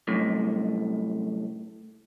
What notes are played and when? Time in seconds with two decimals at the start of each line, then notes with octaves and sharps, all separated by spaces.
0.07 C2 F#2 A2